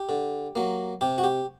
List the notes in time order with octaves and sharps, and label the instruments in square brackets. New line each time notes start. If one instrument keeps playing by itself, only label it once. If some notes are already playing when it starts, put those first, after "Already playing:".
Already playing: [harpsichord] G4
D3
F#3 A#3
C3 G4
F#4
G4